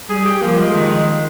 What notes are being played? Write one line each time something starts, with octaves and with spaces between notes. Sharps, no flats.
G3 G#4
G4
F3 A#3
G#3
D#3